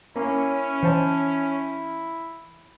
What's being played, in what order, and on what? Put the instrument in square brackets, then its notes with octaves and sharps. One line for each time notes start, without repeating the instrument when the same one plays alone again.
[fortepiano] A#3 [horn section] C#4 [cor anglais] E4
[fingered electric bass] E3 [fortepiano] C5 C#5 A5